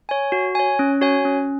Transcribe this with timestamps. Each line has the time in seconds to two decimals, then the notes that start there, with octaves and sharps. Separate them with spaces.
0.09 C#5 G#5
0.32 F#4
0.55 C#5 G#5
0.79 C#4
1.01 F#4 C#5 G#5
1.25 C#4